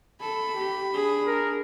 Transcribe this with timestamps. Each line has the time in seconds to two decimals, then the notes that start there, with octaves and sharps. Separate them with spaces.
0.21 A4 B5
0.58 G4
0.94 D4 G#4
1.27 A#4